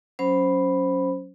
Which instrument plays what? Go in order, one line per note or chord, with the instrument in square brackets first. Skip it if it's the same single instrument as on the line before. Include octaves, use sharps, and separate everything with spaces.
[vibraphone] F#3 C#4 C5 B5